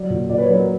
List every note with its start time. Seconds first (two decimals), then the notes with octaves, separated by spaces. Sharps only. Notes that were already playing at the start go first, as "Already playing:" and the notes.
Already playing: F#3 D5
0.10 A#2
0.29 A#2 D5
0.38 B4
0.42 C#5
0.49 F#3 B4
0.55 A#4